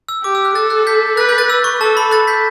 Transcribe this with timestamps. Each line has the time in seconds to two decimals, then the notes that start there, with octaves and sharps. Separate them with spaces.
0.09 E6
0.23 G4 D6
0.35 E6
0.45 F#6
0.55 A4 F#6 A6
0.70 F#6
0.87 G6 B6
1.17 B4 F#6 A6
1.29 G6
1.38 F#6 A6
1.50 E6
1.64 C#6
1.81 A4 A5
1.97 B5
2.11 F#6 A6
2.27 G6 B6